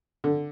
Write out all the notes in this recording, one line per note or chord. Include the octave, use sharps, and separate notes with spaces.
D3